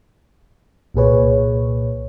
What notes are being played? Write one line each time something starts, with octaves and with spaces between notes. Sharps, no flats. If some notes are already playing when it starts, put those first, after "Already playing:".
C2 A#2 G#4 B4 C#5